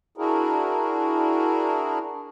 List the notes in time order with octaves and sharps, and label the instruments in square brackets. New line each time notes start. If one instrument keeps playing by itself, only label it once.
[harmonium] D4 E4 F#4 G#4 A#4